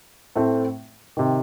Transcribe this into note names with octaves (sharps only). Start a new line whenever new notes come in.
A2 A3 C4
C3 D#3